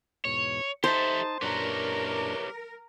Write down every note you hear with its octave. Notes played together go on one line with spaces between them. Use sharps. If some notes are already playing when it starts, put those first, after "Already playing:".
E2 G#2 B2 C#5
D#4 G4 A4 C5 E5 A5
F#2 A#2 D4 G4 A#4 B4 C#5